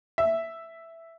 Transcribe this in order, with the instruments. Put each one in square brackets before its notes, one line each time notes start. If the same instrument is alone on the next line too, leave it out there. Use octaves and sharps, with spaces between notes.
[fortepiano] E5